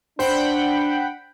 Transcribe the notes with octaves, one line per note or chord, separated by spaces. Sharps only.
D4 C5 F#5 G5 B5